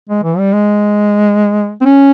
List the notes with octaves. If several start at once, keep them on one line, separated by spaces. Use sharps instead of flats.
G#3
E3
G3
G#3
C4
C#4